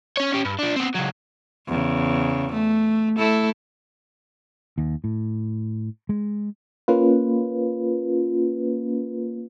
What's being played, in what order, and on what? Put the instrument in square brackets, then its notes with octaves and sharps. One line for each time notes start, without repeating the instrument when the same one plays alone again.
[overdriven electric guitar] C#4 C#5
C#4 G4
G2
F3 D4
B3 C4
C#2 F#3
[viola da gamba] E2 C#3
A3
A3 E4 A4
[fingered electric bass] D#2
A2
G#3
[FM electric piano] A#3 C#4 F4 B4